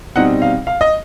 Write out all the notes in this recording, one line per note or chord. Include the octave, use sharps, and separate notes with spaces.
B2 G3 C4 D#4 F#5
F5
F5
D#5